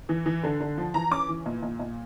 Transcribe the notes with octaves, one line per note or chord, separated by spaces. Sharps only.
E3
E3
D3
D3
F3
E3 A#5
C#4 D6
E3
A#2
A#2
A#2